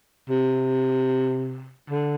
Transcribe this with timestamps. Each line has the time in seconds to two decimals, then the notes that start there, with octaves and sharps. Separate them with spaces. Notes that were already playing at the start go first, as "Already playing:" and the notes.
0.29 C3
1.90 D3